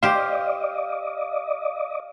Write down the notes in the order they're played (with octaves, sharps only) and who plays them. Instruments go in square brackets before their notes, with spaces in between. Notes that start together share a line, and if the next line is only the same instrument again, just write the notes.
[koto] G4 C5 [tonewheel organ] D5 D#5 [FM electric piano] F5